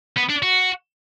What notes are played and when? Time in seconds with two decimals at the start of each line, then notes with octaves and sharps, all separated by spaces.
0.17 B3
0.30 D4
0.43 F#4